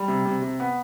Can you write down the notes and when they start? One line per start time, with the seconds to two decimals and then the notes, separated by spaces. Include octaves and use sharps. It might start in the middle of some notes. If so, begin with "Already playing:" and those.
Already playing: G3
0.08 C3
0.25 C3
0.42 C3
0.60 B3